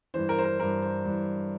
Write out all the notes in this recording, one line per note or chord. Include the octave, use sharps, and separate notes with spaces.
G2 E3 C5
A#4
C5
A#4
G2 E3 A#4
C5
G2 E3